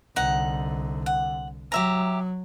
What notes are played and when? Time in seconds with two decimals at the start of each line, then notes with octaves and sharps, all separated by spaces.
0.16 C2 D3 D#4 F#5
1.06 F#5
1.72 F#3 G4 E5 A#5